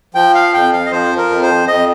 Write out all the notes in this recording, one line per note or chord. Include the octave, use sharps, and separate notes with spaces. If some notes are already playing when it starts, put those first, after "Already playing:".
F3 G5
F5
F2 G5
F5
D#5
F3 C5
A#4
F2
C5
F2 D#5